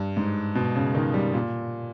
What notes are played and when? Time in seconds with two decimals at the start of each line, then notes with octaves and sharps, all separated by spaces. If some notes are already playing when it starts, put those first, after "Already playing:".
Already playing: G2
0.17 G#2
0.55 B2
0.75 C#3
0.95 D#3
1.14 G3
1.34 A#2